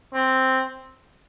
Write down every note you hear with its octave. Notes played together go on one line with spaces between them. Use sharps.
C4